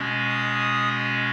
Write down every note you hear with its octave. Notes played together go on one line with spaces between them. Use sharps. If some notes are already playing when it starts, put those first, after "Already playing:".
Already playing: B2 G#3 C#4
D#6